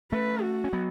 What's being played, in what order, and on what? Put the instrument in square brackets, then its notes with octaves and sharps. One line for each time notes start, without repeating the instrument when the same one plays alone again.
[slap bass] A3 C#4 [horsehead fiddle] B4
[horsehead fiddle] F#4
[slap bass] C#4
F#3 B3